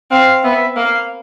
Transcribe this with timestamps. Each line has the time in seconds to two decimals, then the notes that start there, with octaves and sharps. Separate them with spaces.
0.11 C4 F5
0.44 B3 E5
0.77 A#3 F5